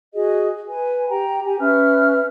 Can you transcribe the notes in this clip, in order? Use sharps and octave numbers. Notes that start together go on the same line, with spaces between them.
F#4 G#4 D#5
B4 G#5
G4 G5 A#5
G4 G#5
C#4 B4 E5 F6